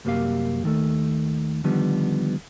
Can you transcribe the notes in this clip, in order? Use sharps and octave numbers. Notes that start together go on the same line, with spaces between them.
C2 F#2 A#3 G4 F5
D#2 D#3 A3
D3 D#3 F3 G3 B3